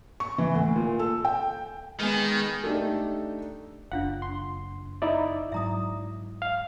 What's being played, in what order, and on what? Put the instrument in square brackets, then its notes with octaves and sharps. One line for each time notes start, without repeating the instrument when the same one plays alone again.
[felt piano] C#6
E3
D2
A#2
A4
G5
[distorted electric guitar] D#3 [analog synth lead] G#3 [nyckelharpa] B3 G#5
[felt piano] A3 D4 D#4 G4 A4
[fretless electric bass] F#1 [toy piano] D4 F4 F5 [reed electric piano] F#5
[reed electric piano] C6
D#4 E4 D5
[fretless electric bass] G#2 F#3 [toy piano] E5 A#5 D#6
[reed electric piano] F5